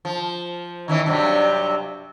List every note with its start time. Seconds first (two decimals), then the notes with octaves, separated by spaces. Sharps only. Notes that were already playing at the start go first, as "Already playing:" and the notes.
0.05 F3
0.88 D#3 E3 C#4
1.06 G2 C3 F#3